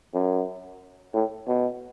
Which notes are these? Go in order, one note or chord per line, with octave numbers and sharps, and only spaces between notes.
F#2
A2
B2